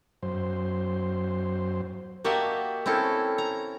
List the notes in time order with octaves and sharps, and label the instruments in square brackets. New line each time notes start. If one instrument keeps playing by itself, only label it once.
[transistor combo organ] F#2 C5
[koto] A#3 F#4 G4 D#5 E5 A5
C4 C#4 E4 A4
A#5